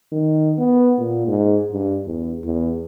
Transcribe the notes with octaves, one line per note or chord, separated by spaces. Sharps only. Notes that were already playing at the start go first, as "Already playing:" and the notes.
D#3
B3
A#2
G#2
G2
E2
E2